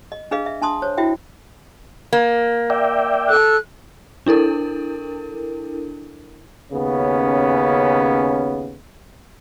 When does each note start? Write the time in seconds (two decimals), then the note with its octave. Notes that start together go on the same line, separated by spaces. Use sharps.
0.12 D#5
0.31 D4 G#4 B4 D#5 F5
0.46 E5
0.62 D4 A5 C6 D#6
0.82 C5 C#5
0.97 E4 F#4 E5 G5
2.13 A#3
2.70 D5 E5 G5
3.29 A4 E6 F#6
4.26 D4 E4 A4 A#4
6.72 D#2 C#3 B3 C#4